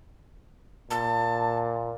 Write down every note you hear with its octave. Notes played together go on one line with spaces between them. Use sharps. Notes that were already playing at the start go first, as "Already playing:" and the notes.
A#2 A5